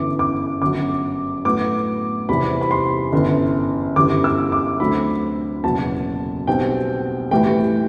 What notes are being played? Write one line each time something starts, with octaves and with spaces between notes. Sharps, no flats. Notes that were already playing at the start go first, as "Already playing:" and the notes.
Already playing: G1 F#2 E3 D6
D6
G1 F#2 F#3 D6
A2 F#3 B3 D6
E2 C3 E3 G3 C4 B5
B5
C6
G1 F#2 E3
G1 F#2 E3 G3 D6
E6
D6
D2 D3 F#3 C4 B5
F#1 E2 B2 F#3 A5
B1 B2 G3 C4 G5
A1 A2 E3 G3 G5